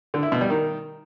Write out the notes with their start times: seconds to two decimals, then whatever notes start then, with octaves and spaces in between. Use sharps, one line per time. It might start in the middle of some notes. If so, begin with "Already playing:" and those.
0.14 D3
0.23 E4
0.32 B2
0.41 G3
0.50 D#3